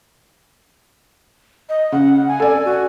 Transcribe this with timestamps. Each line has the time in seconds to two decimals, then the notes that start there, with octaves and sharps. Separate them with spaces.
1.69 D#5
1.92 C#3 F#5
2.28 G#5
2.40 A4 D5
2.65 F#4